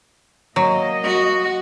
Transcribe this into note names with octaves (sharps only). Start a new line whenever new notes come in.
F#3 A#3 D#5
F#4